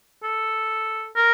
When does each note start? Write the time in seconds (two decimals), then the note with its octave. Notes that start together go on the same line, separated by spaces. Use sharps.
0.23 A4
1.15 A#4